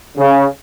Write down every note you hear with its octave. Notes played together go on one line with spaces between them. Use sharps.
C#3